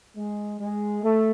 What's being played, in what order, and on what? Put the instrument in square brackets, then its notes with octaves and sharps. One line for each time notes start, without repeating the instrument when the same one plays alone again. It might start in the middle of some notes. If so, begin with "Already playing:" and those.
[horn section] G#3
G#3
A3